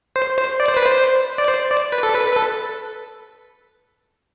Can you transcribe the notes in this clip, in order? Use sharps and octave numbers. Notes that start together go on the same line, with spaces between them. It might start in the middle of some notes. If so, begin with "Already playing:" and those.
C5
C5
D5
C5
B4
C5
D5
C5
D5
B4
A4
B4
B4
A4